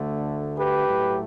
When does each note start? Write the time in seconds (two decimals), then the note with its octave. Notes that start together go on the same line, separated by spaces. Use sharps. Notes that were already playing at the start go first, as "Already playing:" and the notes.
Already playing: D2 D3 A3
0.58 G4 B4
0.86 A2 F#3 A3